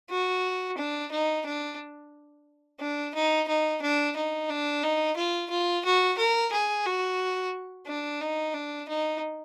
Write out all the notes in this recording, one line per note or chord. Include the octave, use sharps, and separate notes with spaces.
F#4
D4
D#4
D4
D4
D#4
D#4
D4
D#4
D4
D#4
F4
F4
F#4
A#4
G#4
F#4
D4
D#4
D4
D#4